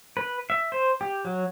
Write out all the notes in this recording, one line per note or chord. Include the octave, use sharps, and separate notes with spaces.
B4
E5
C5
G4
F#3